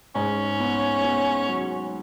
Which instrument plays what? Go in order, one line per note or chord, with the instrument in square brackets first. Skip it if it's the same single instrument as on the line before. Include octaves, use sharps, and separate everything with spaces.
[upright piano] G#2 [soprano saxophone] C#4
[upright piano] B3
B3
F#3